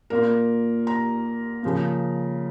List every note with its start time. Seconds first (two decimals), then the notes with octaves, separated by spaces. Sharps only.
0.10 A#2 A#3 F4 A#4
0.87 A#5
1.63 C#3 F3 A#3